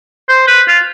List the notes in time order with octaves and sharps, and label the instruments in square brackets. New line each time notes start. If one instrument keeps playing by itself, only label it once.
[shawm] C5
B4
F4